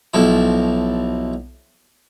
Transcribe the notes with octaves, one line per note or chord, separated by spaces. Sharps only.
B1 F3 E4